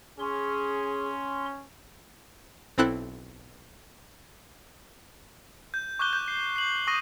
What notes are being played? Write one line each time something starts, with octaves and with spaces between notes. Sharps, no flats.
C#4 G#4 C6
B1 C4 E4 A4 F#6
G6
C#6 D6 F#6 G6 G7
G6
C7
C7 F#7
C#6 D#6 A#6 D#7